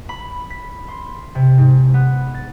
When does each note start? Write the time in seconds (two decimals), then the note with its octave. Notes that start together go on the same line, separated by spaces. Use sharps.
0.09 B5
0.50 B6
0.88 C6
1.35 C3
1.58 G#2
1.94 B3
2.35 A6